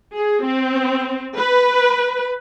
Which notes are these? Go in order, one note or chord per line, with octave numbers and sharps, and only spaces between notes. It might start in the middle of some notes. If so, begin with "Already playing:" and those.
G#4
C4
B4